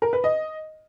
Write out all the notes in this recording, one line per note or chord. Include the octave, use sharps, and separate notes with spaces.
A#4
B4
D#5